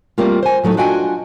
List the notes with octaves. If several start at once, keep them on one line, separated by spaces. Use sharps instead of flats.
G3 A3 A#3 C4 F4
C5 G#5
A2 F#3 A3 D#4
D4 F4 F#4 D#5 G5 G#5